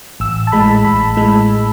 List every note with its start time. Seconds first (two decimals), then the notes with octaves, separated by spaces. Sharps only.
0.20 A1 E6
0.47 A5
0.52 A2 G#3 B5
0.85 A1 B5
1.17 A2 G#3